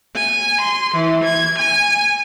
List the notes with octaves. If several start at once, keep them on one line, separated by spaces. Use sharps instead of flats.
G#5
C6
E3
G#6
G#5